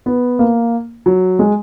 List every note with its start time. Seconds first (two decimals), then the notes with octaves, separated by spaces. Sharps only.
0.06 B3
0.39 A#3
1.06 F#3
1.39 G#3